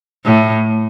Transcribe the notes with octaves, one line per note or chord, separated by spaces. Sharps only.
A2